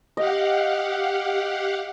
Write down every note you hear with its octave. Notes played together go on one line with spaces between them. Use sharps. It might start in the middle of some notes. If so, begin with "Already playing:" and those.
G4 D#5 F5 F#5